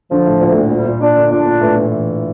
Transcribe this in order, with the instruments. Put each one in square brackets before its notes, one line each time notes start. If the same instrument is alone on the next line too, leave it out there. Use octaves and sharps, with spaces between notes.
[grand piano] D3 [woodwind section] F3
[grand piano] A2
[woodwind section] D2 [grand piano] A#2
[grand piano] A2
A#2
[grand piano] A#2 [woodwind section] G3
[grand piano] A#2
[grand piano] A#2 [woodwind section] D4
[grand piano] D3
[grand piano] A#2 [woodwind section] D4
[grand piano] A#2
[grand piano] A2 [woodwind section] E3
[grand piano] A#2
[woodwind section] E3